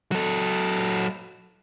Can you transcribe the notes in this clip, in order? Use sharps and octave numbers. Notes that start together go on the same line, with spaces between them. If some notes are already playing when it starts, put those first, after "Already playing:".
F#3 A4